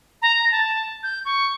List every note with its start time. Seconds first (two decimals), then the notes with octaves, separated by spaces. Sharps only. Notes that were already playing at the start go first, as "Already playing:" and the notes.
0.22 A#5
0.51 A5
1.03 G6
1.25 C#6